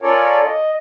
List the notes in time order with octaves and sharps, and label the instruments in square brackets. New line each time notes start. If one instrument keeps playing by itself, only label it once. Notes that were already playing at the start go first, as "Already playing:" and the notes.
[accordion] C#4 F4 A4 A#4 C#5 D5
D#5